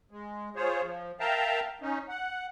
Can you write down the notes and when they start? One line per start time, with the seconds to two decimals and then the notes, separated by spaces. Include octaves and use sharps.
0.11 G#3
0.56 F4 G#4 C5 C#5
0.82 F3
1.20 A#4 E5 F5 G5 A5 A#5
1.81 C#4 D#4
2.09 F#5